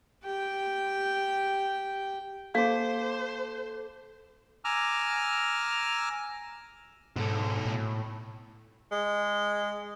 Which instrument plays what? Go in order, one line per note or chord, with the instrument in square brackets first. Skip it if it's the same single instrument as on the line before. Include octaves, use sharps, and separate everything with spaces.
[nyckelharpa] G4 G5
[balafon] A#3 [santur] A4 D6 [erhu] C5 [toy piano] F5
[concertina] G#5 A#5 D6 E6 F6
[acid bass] G#2 [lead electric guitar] B2 A4
[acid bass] A2
[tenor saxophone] G#3